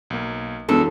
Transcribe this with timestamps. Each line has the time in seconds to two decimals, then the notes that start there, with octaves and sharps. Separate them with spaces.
0.10 B1 A#3
0.69 E1 F#2 B3 A4